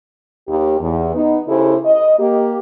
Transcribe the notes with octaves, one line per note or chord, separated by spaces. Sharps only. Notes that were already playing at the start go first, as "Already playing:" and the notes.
D#2 G4
E2
B3 D#4
C#3 E4 G4 A4 C5
D#5
A#3 G4